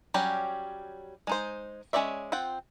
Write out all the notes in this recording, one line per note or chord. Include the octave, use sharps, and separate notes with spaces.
F#3 G3 C#4 G4
G#3 D#4 C5
G#3 C#4 C#5 D5 E5
C4 F4 F#5 G5